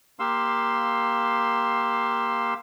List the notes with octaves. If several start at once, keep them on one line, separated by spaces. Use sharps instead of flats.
A#3 G4 F5 C6 E6